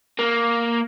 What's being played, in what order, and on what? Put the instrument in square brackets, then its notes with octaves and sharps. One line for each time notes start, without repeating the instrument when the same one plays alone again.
[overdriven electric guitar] A#3